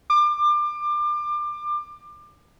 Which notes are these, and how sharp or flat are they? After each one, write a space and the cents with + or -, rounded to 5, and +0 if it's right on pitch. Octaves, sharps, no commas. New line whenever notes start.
D6 +25